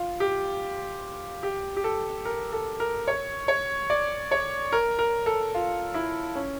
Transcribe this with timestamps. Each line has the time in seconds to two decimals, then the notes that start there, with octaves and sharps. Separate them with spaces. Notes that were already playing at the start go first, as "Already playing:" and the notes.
Already playing: F4
0.20 G4
1.43 G4
1.77 G4
1.84 A4
2.25 A#4
2.53 A4
2.80 A#4
3.08 C#5
3.48 C#5
3.90 D5
4.31 C#5
4.72 A#4
4.99 A#4
5.26 A4
5.55 F4
5.94 E4
6.35 C#4